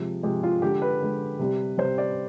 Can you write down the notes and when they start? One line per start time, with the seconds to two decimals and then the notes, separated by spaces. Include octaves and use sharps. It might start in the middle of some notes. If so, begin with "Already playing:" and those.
Already playing: C3 F3 G#3
0.23 C3 F3 G#3 G4
0.43 F4
0.62 D3 G#3 G4
0.82 B4
1.01 D3 G#3
1.39 C3 G3
1.78 C3 G3 C5
1.98 D5